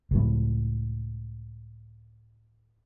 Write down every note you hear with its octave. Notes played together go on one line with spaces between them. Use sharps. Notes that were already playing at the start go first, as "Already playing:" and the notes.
C#2 A2